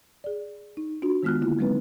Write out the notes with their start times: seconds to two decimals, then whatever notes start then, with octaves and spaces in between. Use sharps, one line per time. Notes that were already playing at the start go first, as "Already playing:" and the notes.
0.24 G#4 D5
0.77 D#4
1.02 D4 F4 F#4
1.23 D#3 G#3 B3 F4 F6 F#6
1.41 D3 A#3 E4 F4
1.58 F#3 G#3 A#3 C4 D#4 B4